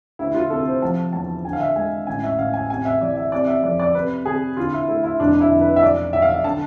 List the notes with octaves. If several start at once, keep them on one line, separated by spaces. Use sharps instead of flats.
D2 E4
F4
C3 A4
C5
F3 A5
E2 A5
D3 G#5
F5
E5
G#3 G#5
A1 G#5
E5
A1 F5
G#5
C3 G#5
E5
E3 D5
E5
C3 D5
E5
F2 D5
D5
C3 B4
C3 G#4
D3 F4
E4
A3 E4
E4
F1 D4
E4
F1
B4
E5
B1 D5
B1 E5
F5
E5
D3 A5